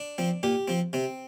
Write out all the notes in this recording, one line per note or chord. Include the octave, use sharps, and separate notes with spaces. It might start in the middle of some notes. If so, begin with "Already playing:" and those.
Already playing: D4
F3 C4
A#2 G4
F3 C4
C3 C4